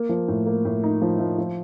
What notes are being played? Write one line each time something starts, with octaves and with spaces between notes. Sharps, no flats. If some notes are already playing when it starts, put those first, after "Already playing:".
Already playing: A#3
F3
A2
A#3
A2
D#4
F3
F3
F3